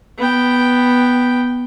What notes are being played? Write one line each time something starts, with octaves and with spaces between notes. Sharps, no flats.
B3 G5